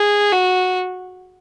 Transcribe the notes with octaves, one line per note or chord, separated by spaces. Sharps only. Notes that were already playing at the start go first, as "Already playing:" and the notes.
Already playing: G#4
F#4